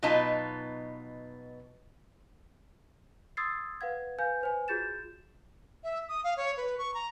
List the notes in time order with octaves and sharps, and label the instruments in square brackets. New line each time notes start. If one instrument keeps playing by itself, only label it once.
[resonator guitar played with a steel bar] B2 F#3 B3 D#4 F4 A5
[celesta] C6 D#6 E6 G#6 A6 C7
B4 F5 F#5 G#6
B4 F5 G#5 G6
B4 C5 G#5
F4 F#4 G#4 G6 A6 E7
[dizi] E5
D#6
F5
C#5
B4
C#6
A#5